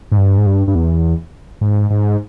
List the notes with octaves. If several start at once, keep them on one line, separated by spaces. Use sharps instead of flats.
G#2
G2
G#2
G2
G2
E2
G#2
G#2